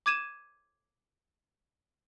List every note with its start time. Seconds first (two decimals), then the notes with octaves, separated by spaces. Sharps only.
0.06 D6 G#6 D#7 E7